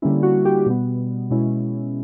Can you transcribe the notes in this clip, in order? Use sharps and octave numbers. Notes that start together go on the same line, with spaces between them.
D3 G3 A#3 C#4 E4
F#4
G4
B2 G3 B3
B2 G#3 C#4 E4